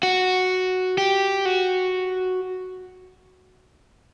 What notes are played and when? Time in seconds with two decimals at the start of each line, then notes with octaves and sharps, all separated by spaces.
0.03 F#4
0.98 G4
1.45 F#4